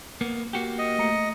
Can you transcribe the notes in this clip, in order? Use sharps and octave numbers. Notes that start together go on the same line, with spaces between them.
A#3 B3
A#3 F#4 G4
D#5
A3 A#5 C#7